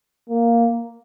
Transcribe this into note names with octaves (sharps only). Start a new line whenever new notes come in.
A#3